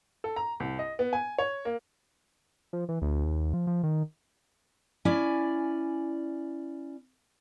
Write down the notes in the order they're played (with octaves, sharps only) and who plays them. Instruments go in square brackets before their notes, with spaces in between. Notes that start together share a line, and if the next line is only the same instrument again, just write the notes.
[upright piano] A4
A#5
C2
D#5
B3
G#5
C#5
A#3
[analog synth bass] F3
E3
D2
D#2
F3
F3
D#3
[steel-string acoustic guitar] C#4 E4 D5 G#5